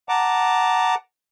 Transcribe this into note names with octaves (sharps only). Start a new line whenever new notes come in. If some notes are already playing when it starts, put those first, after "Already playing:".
F#5 A5 A#5 D6